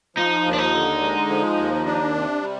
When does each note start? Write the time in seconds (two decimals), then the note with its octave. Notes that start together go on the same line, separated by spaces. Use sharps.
0.17 F3 D#4
0.45 D#2
0.53 D4
0.58 D#4
0.73 D3
1.01 G#3
1.30 F3
1.57 D#2
1.86 D4
2.14 C3
2.42 G3